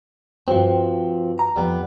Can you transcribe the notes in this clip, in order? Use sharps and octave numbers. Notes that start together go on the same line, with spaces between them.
G2 F3 C4 F#4 G5
A#5
F2 F3 G3 B3